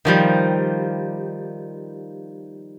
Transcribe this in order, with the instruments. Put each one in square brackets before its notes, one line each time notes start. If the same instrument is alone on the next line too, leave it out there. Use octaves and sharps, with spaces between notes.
[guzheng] D#3 F3 G3